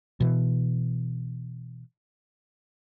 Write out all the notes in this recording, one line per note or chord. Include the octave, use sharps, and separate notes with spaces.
B2 E3